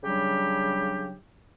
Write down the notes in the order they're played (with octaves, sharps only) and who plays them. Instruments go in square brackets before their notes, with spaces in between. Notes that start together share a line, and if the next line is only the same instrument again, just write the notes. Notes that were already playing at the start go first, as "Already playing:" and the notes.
[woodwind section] C#3 F#3 G3 D4 G4